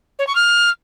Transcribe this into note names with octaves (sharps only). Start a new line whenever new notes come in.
C#5
C#6
F6